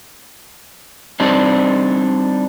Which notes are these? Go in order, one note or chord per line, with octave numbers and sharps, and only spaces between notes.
G3 C4 D4 D#4